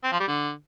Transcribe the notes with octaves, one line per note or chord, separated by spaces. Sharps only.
C4
F3
G3
D3